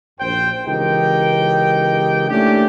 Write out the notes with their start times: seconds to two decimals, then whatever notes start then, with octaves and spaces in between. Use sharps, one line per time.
0.20 A#1 F#2 C5 G5
0.66 C#2 E3 D#4 G4 A#4 G5
2.30 A3 A#3 C#4 D4 E4 G4